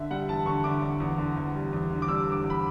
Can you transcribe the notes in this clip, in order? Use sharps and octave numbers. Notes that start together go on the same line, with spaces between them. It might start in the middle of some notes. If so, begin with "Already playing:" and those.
Already playing: D3 E5
G3 F#5
E2 A5
D3 C#6
D3 D6
D3
E2
D3
E2
G3
E2
D3
D6
G3 E6
D3 D6
E2
B5